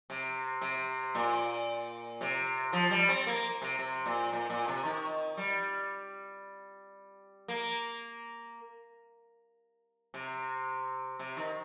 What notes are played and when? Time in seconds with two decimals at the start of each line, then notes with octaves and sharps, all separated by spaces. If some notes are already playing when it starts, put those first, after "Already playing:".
0.10 C3
0.61 C3
1.15 A#2
2.21 C3
2.73 F3
2.91 G3
3.09 C4
3.27 A#3
3.62 C3
3.79 C3
4.06 A#2
4.33 A#2
4.50 A#2
4.68 C3
4.85 D#3
5.37 G3
7.48 A#3
10.14 C3
11.19 C3
11.37 D#3